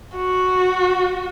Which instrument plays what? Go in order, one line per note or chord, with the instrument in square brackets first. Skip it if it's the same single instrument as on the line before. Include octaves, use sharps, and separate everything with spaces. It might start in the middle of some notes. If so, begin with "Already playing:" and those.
[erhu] F#4